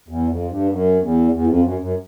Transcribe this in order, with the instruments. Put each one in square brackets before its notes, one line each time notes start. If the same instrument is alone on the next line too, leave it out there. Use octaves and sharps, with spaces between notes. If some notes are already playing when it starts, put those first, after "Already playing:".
[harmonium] E2
F2
G2
F#2
E2
E2
F2
F#2
F#2